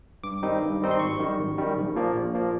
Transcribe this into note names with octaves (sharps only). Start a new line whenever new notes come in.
G2 D6
D#3 G3 C4 D#4
G2
D#3 G3 C4 D#4
C6
G#1 C#6
F#2 D#3 G3
G#1
F#2 D#3 G3
A#1
A#2 F3 A#3
A#1
A#2 F3 A#3